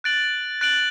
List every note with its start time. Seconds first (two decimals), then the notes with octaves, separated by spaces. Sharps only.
0.04 F#6 A6 D7 F#7
0.61 F#6 A6 D7 F#7